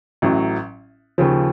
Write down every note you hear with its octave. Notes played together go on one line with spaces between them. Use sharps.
A1 A2 F#3
D#2 C#3 F3